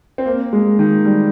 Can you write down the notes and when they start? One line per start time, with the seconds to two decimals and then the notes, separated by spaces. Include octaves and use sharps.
0.18 C4
0.26 A#3
0.53 G#3
0.79 D#3
1.05 G3